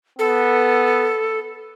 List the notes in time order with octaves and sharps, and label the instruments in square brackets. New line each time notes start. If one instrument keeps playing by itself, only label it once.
[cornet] B3 [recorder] A4